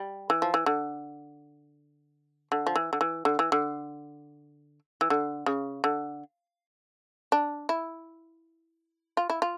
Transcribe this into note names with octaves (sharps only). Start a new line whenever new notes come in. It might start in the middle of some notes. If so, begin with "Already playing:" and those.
Already playing: G3
E3
F3
E3
D3
D3
F3
E3
D3
E3
D3
E3
D3
E3
D3
C#3
D3
D4
E4
F4
E4
F4